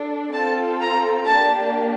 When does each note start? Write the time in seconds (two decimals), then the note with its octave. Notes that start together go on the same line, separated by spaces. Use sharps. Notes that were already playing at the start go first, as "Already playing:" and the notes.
Already playing: D4 A4
0.33 C4 F4 A4 A5
0.80 A#5
1.26 A#3 D4 G4 A5